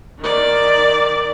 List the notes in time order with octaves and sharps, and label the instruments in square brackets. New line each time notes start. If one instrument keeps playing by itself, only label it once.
[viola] D#3 D5